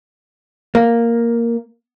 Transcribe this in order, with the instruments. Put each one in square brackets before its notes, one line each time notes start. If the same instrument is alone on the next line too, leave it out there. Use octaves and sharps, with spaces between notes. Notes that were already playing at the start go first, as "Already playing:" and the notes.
[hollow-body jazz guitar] A#3